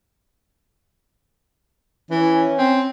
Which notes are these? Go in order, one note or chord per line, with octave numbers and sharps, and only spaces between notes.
E3 C#4
C4